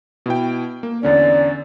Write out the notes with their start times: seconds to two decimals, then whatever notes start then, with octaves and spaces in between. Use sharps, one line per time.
0.26 B2 E4 G5
0.83 A#3
1.03 E2 D3 C#4 D5